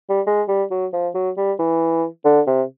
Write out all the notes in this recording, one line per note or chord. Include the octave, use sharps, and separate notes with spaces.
G3
G#3
G3
F#3
F3
F#3
G3
E3
D3
C3